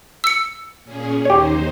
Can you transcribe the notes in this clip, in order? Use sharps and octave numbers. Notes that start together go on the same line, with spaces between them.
E6 C#7
A#2 C#4 G#4
D#2 D#4 G4 C5 C#5